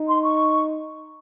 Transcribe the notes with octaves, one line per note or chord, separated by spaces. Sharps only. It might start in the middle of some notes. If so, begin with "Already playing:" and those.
Already playing: D#4
C6
C#6